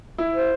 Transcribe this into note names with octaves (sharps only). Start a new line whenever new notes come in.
E4
C5